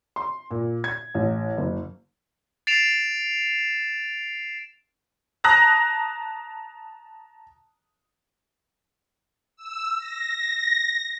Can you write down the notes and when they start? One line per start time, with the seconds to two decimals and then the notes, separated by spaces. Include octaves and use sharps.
0.16 C6
0.51 A#2
0.84 G#6
1.14 A1
1.57 F#1
2.67 A6 C7 D7 E7 F7
5.44 A5 A#5 D#6 F#6 A#6
9.56 E6
9.98 A#6